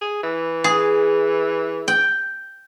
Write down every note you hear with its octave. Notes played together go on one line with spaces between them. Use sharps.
G#4
E3
G#4
G5